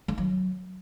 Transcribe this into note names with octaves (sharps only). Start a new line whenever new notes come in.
D#3
F#3